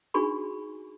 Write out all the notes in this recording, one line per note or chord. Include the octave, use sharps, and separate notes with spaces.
D4 D#4 F#4 G#4 B5 C#6